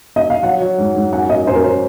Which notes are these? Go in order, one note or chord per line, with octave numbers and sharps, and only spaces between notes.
D#5
F5
F#3 F#5
F#3
G#2
G#2
F#2 F#5
F#2 D#5
F#2 C5
A#4
F#3 C5